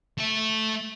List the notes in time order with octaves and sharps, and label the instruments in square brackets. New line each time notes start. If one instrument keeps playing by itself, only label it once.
[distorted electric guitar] A3 E5